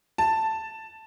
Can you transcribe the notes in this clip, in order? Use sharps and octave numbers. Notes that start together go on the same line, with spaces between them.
A5